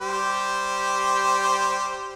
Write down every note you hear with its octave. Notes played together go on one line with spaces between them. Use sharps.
G3 G4 C5